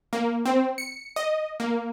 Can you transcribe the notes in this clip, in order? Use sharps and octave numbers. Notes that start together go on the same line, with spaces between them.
A#3
C4
C#7
D#5
A#3